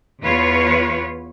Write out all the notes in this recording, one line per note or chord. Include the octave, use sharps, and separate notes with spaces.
E2 F4 B4 C#5